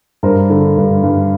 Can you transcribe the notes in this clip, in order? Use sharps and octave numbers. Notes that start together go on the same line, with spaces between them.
G2 A#4 C5
D3
G2
G2